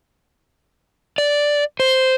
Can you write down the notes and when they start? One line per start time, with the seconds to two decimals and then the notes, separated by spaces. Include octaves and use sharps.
1.18 D5
1.80 C5